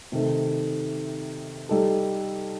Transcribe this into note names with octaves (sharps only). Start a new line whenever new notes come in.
C3 D#3 A3
G3 D#4 A4